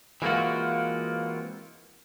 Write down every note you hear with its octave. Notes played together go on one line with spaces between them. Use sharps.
E3 G#3 A#3 C4 F4 F#4